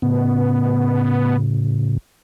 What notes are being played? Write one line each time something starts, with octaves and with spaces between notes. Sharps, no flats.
A2 C#3 B3